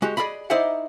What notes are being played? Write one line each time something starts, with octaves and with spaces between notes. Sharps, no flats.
G#3 F#4 G4
G#4 A#4 D5 D#5 B5
D#4 E4 C5 D5 E5 F#5